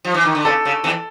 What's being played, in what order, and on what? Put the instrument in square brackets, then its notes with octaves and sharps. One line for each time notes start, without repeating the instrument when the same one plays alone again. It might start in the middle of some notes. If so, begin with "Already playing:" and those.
[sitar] F3
E3
D#3
D3
[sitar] C#3 [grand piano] A4
[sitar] C#3
E2 E3